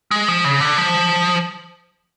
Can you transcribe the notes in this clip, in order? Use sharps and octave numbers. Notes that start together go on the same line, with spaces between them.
G#3
F3
C#3
D3
F3